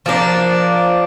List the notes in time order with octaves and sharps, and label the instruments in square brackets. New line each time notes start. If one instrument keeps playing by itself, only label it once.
[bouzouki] F3 A#3 D4